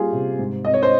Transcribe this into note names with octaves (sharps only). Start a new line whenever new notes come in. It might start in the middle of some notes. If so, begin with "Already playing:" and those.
Already playing: G3 A#3 C#4 F4 G4 G#4
C3
G#2
C4 D#5
C#5
C5